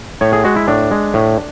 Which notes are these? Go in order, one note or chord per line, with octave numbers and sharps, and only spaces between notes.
A2 C#5
G#4
G#3 F#4
E4
A2 D4
G#3
A2